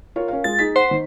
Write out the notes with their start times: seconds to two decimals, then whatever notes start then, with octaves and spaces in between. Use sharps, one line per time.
0.16 F4 A#4 C#5
0.28 C#4 A#4 F5
0.44 G#3 F4 G#4 A6
0.59 D#4 G#4 B6
0.76 C5 F#5
0.91 D#3